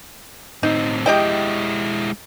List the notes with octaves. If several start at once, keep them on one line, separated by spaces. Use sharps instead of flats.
A2 C4 D#4
G#3 E4 G4 D#5 G5